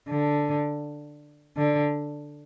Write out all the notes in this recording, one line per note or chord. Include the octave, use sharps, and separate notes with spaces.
D3
D3